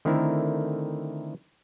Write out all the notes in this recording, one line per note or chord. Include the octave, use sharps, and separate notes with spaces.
D3 D#3 A3 C4 E4 A#4